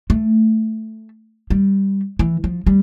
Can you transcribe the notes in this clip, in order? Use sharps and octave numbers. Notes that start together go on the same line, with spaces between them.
A3
G3
E3
F3
G3